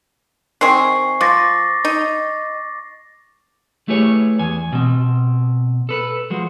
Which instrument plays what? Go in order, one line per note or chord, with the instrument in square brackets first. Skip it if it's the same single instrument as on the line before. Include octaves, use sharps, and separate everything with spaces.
[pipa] D#3 C4 G#4 [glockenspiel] C#6 C7
[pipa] F3 [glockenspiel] D6 A6 A#6
[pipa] D#4
[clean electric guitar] A3 E4 G4 G#4 B4 C#5
E2 G#5
B2 C4
A4 B4
F3 G#3 F#4